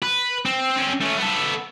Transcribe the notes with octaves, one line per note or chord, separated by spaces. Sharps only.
B4
C4
C4 C#4
A3 C#4
B3 A4